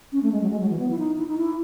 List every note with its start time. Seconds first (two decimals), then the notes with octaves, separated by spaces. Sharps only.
0.12 C#4
0.23 A3
0.32 G#3
0.42 F#3
0.50 G#3
0.60 F#3
0.70 E3
0.79 B3
0.90 E4
0.98 D#4
1.18 E4
1.27 D#4
1.37 E4